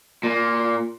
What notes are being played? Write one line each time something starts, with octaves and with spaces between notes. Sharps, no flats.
A#2